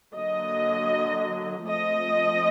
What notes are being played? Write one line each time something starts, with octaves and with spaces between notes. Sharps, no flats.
D3 F#3 A#3 D#5
F3 A3 C4 D#5